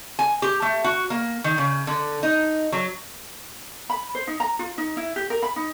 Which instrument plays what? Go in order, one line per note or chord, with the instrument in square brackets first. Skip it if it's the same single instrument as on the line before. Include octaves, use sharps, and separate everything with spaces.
[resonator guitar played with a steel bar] G#5
G4
A3
F#4
A#3
D#3
C#3
D3
D#4
F#3
[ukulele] B5
C5
D#4
A#5
F4
D#4
E4
G4
A#4
B5
D#4